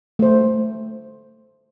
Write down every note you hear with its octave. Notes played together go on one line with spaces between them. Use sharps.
A3 C5